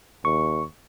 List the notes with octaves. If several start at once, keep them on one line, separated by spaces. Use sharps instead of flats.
D#2 C#6